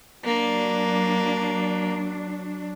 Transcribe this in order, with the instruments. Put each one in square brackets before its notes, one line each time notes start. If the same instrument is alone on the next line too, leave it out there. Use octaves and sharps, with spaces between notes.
[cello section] F#3 D4 [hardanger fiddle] A#3